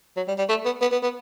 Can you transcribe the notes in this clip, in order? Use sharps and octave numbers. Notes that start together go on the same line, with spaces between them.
F#3
G3
G3
A3
B3
B3
B3
B3